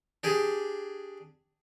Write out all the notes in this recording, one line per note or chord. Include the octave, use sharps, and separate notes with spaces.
D4 G4 G#4